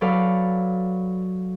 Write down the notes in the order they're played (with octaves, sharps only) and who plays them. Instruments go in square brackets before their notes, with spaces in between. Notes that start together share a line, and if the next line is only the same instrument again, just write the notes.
[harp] F#3 A4 B4 D5 F5